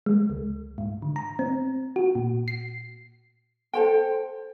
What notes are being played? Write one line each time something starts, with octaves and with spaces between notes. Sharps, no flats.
G#3
C#2
G#2
D3
A#5
C4
F#4
A#2
C7
A4 C5 G5